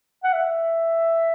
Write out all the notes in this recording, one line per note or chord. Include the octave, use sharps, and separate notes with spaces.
F#5
E5